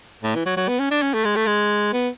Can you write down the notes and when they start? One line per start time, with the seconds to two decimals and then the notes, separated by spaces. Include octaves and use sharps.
0.23 A2
0.35 E3
0.46 F#3
0.57 F#3
0.68 B3
0.80 C#4
0.91 D4
1.02 C#4
1.14 A3
1.25 G#3
1.36 A3
1.46 G#3
1.93 B3